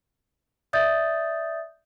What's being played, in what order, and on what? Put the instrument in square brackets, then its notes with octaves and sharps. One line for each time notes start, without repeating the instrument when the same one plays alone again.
[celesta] D5 E5 D#6 G6 A6